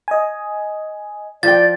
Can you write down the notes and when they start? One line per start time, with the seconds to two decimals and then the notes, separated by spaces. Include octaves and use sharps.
0.08 D#5 G#5
1.43 F3 D5 G5 A6